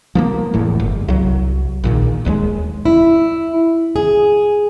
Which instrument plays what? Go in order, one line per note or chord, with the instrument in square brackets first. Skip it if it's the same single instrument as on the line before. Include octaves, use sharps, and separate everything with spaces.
[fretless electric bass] F3 A3 A#3
F1 E2 A2
G1
C2 F#3
A#1 A#2 D#3
D#1 D#2 E3 G#3
[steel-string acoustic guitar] E4
G#4